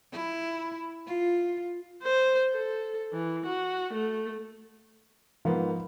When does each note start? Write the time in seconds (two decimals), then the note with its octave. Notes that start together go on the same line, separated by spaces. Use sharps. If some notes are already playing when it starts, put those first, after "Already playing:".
0.12 E4
1.07 F4
2.03 C5
2.52 A4
3.13 E3
3.45 F#4
3.93 A3
5.45 G#2 F3 A#3 B3